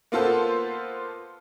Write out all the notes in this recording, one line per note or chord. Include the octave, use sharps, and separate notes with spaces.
A#3 B3 F4 A4 C5